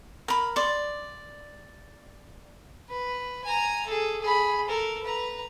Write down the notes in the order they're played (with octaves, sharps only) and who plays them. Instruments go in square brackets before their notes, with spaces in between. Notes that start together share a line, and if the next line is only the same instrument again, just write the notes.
[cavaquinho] A#4 B5
D5 C6
[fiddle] B4
G#5 A#5
G#4 A4
G#4 B5
A4 A#4
B4 A#5